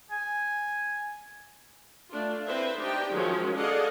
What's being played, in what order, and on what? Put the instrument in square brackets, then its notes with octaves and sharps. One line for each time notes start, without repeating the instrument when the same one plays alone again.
[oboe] G#5
[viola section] A3 D4 F4
C4 E4 B4 C5 E5
D4 D#4 G4 G5
D#3 F3 F#3 G#3 C#4
G#4 A4 D5 D#5 F5 F#5